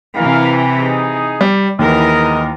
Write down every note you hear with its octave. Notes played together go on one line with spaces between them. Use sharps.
C3 E3 A#4 F5
D#4 G#4
G3
D#2 E3 G#3 B3 A#4 D#5